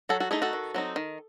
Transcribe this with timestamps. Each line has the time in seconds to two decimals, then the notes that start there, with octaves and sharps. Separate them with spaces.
0.09 F#3 F#4 A4
0.20 F#4 A4
0.31 A3 D#4 E4 G#4
0.42 F#4 A4
0.53 D#3
0.74 F#3 C4 D#4
0.96 D#3